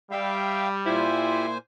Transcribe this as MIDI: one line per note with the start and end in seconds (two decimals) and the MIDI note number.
0.11 1.05 55
0.11 0.68 76
0.11 0.68 77
0.11 0.68 79
0.86 1.58 46
0.86 1.54 64
0.86 1.46 65
0.86 1.46 67
0.86 1.58 72
0.86 1.46 76
0.86 1.58 80